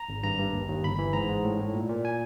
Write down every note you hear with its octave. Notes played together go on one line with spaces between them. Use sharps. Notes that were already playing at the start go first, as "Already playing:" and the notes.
Already playing: A#5
G#1
G2 A#5
G2
D#2
D#2
G1 B5
E3
G#2 A#5
G#2
A2
A2
A#2
A#2
G#5